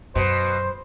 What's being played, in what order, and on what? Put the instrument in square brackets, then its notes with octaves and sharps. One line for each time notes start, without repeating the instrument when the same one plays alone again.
[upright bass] F#2 [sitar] B2 [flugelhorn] C5